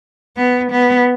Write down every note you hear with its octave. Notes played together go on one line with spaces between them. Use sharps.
B3
B3